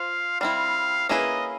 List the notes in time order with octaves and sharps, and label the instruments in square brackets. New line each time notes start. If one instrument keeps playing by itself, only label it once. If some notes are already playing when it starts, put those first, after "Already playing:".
Already playing: [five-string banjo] F4 C5 [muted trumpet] F5
[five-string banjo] G3 C4 E4 [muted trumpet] F5
[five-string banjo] A#3 C#4 E4 G#4 B4 [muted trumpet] D#5